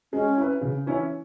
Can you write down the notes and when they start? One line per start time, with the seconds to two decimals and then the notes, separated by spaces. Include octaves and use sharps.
0.13 G#3 C#4
0.37 E4 B4
0.61 C#3
0.86 E3 C#4 E4 C#5